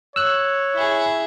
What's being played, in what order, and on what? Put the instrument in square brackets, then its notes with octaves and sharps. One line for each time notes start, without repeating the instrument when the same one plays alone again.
[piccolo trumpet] C#5 [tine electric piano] E6 F#6
[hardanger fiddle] E4 G#4